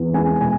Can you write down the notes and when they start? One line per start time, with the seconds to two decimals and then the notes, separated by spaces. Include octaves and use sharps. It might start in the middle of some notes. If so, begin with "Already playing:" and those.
Already playing: E2
0.14 G#3 G#5
0.41 B2 G#5